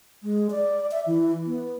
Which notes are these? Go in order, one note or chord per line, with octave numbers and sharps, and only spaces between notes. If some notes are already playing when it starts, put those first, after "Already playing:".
G#3
D5
E5
E3
B3